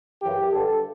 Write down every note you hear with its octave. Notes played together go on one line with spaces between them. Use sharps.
F#2 C#3 E3 G4
G2 D3 A4